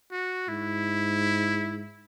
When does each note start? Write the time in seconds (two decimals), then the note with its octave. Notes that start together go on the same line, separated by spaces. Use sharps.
0.11 F#4
0.48 G#2 E4